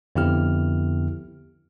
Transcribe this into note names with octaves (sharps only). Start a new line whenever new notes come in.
F2 D3 B3 E4 G4 F6